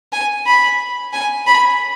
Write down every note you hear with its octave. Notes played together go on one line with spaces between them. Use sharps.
G#5
B5
G#5
B5